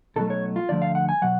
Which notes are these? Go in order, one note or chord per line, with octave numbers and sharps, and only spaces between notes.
B1 B2 F#3 A3 A4
C#5
F4
D2 D3 F3 A3 D5
F5
F#5
G#5
B2 F#3 F#5